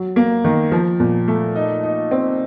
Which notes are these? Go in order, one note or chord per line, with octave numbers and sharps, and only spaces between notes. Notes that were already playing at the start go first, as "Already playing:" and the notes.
Already playing: F#3
A#3
D#3
F3
A#2
A3
D#4
D#4
C4